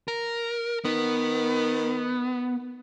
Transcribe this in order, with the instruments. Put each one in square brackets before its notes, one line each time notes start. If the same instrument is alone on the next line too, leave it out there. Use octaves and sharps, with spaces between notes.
[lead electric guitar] A#4
[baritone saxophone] D#3 [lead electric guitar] B3